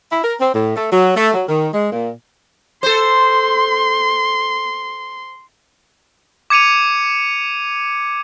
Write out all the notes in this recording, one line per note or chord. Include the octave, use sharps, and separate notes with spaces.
E4
A#4
C4
A2
A3
F#3
A3
F#3
D#3
G#3
A#2
A4 C5 C6
D6 G#6 C#7 D#7 F7